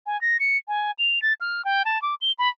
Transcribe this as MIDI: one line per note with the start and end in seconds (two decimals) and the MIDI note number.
0.06 0.20 80
0.21 0.37 94
0.40 0.57 97
0.68 0.91 80
0.99 1.22 101
1.22 1.33 93
1.41 1.65 89
1.65 1.83 79
1.85 2.01 81
2.02 2.15 86
2.21 2.32 103
2.39 2.49 83